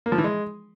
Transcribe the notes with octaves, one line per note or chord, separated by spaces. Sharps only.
A#3
F3
E3
G#3